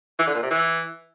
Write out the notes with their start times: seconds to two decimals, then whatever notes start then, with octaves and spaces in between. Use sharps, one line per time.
0.19 E3
0.27 D3
0.35 A#2
0.43 C3
0.51 E3